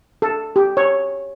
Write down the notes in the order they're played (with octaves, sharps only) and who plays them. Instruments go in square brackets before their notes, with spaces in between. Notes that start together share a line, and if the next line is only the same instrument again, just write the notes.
[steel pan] A4
G4
C#5